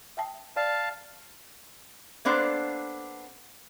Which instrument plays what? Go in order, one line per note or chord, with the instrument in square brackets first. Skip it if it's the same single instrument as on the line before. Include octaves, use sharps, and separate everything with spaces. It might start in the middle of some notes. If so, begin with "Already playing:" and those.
[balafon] E5 G5 A5
[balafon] D5 [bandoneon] F5 A5
[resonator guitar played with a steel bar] A#3 B3 D4 A4 C5